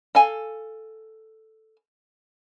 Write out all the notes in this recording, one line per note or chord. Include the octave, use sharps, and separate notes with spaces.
A4 F5 G#5